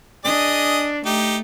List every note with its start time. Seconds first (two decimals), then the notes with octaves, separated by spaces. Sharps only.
0.25 D4 G#4 D#5
1.05 A3 D#4 G4